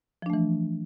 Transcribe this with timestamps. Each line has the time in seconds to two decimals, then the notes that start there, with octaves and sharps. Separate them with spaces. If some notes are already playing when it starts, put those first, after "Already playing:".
0.22 F3
0.26 D4
0.30 A3
0.33 E3